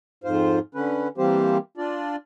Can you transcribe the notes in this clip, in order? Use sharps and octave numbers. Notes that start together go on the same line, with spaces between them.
F2 G#2 F4 C5
D3 C#4 B4
E3 G3 A#3 C4 G4 C5
D4 F4 D5